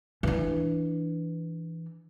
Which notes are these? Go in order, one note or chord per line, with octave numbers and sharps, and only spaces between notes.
E3 D4